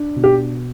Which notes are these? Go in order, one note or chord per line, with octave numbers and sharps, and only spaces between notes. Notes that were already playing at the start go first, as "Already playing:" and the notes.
Already playing: D4
B2
G4